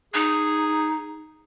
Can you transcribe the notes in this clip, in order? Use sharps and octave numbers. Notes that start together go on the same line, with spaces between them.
D#4 G#4